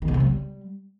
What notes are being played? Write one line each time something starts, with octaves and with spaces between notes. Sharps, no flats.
D#3
C#3
C3
F#3
G3